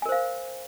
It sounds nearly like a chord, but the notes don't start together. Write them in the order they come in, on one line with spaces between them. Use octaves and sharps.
G#5 A#4 C5 F5